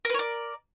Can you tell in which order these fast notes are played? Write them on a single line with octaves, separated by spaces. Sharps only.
A#4 B4 C#5 D5